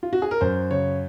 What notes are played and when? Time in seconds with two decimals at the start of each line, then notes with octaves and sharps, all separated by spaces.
0.03 F4
0.13 F#4
0.22 G#4
0.31 A#4
0.41 F#2 C5
0.71 C#3 C#5